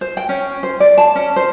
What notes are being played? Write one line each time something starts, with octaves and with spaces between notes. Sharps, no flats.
C5
G5
C#4
C5
D5
A5
C#4
C5